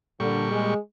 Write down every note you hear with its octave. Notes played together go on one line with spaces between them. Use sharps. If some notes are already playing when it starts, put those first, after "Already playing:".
A#2 D3 G3 C#6
G#3